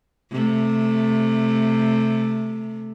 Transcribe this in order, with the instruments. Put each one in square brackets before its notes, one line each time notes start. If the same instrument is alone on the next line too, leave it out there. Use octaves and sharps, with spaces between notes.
[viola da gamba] C3 A3